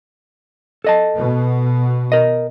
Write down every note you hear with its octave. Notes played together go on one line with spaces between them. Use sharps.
A4 D#5 A5
B2
A#4 D#5